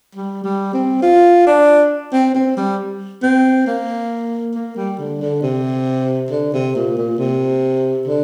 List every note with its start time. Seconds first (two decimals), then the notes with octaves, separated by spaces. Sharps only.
0.15 G3
0.44 G3
0.74 C4
1.02 F4
1.47 D4
2.13 C4
2.35 C4
2.57 G3
3.23 C4
3.67 A#3
4.55 A#3
4.77 G3
4.99 D3
5.22 D3
5.43 C3
6.31 D3
6.54 C3
6.76 A#2
6.97 A#2
7.19 C3
8.07 D3